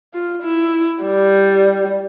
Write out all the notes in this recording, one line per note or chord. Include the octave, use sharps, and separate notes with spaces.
F4
E4
G3